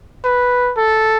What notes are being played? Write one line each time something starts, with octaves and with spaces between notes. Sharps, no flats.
B4
A4